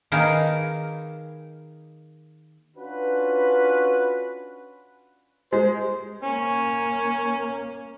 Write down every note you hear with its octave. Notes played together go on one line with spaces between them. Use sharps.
D#3 A#3 G#4 A#4 B4
C#4 D4 F4 F#4 B4
G#3 C5
A#3 C#4